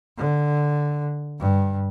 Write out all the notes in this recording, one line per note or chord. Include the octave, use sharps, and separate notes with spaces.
D3
G2